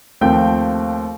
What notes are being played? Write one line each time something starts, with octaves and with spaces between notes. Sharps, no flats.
D#2 F3 A3 C4 G5 G6